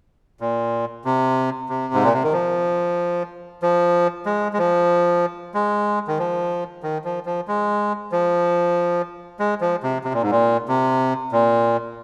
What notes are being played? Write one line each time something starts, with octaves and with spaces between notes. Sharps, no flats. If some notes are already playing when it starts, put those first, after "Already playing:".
A#2
C3
C3
G#2
A#2
C3
D#3
F3
F3
G#3
G#3
F3
G#3
D#3
F3
D#3
F3
F3
G#3
F3
G#3
F3
C3
C3
A#2
G#2
A#2
C3
A#2